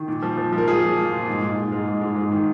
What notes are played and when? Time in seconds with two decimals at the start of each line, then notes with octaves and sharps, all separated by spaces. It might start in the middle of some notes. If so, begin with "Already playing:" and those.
Already playing: D#3
0.08 A#2
0.23 F3
0.37 F3
0.53 F3
0.58 A#4
0.67 F3 F4 G#4
0.82 F3
0.97 F3
1.12 A#2
1.27 G#2
1.42 G#2
1.57 G#2
1.72 G#2
1.86 G#2
2.01 G#2
2.16 G#2
2.32 D#3